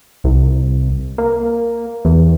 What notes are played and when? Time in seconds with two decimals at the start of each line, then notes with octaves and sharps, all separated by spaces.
0.24 C2
1.18 A#3
2.05 E2